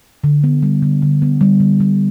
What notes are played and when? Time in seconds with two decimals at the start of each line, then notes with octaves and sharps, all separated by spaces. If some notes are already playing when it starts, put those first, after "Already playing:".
0.24 D3
0.44 B3
0.63 G3
0.82 D3
1.02 D3
1.22 B3
1.41 G3
1.60 D3
1.80 G3